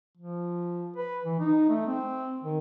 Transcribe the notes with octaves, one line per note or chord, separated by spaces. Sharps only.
F3
B4
E3
D#4
A3
C4
D#3